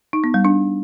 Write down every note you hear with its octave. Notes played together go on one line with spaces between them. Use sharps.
D#4
B3
G3
D4